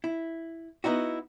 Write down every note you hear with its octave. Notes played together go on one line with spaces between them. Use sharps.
E4
B3 D#4 E4 F#4